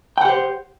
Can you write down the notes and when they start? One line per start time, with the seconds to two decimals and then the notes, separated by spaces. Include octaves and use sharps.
0.18 G5
0.21 F#5
0.25 G4
0.29 C5